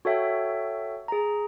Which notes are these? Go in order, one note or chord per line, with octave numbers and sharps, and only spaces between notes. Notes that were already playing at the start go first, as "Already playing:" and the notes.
F#4 A4 C#5 E5 G5
G#4 A#5